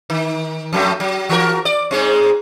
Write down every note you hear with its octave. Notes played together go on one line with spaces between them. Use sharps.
D#3
F2 F#3 A3
F#3
E3 F#4 A#4
D5
G#2 G#3 C4